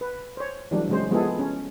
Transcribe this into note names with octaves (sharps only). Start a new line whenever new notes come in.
B4
C5 C#5
E3 F#3 G3 A3 D4
C#3 F#3 G#3 C4 C5
F3 G#3 B3 E4 G#4 A4
C#4